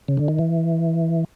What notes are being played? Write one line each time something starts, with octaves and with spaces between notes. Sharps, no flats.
C#3
D3
D#3
E3